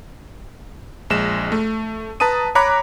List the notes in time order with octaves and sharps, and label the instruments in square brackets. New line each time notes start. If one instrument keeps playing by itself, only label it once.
[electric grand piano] A#1 G#3 E7
A3
B4 A5 A#5 D#6 D#7
C#5 A#5 B5 D6 F#6